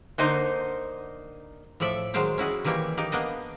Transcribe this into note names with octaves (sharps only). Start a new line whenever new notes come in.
D3 A#3 D#4 C5
A2 F3 A4 D5 E5
D#3 F#3 G#3 C5 F5 G5
C#4 E4 F#4 G#4
D#3 E3 G3 A#3 G4 C#5
A#3 D#4 G4
A#3 B3 D4 D#5